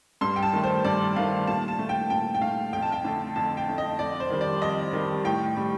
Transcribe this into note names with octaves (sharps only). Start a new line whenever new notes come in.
G2 C6
G5
A5
D#3 A3
C5
G2 D5
D#3 A3 F5
A#2 A5
A5
A3
G5
A#2 G5
G5
A3 F5
F2 G5
A5
G5
D3 A3
F2 A5
G5
D3 A3
D#5
F2 D5
C5
D#3 G3
D5
F2 D#5
D#3 G3
A2 G5
G3